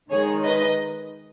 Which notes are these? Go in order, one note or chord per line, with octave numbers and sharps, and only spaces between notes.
D#3 G#3 D#4 G#4 C#5
B4 D#5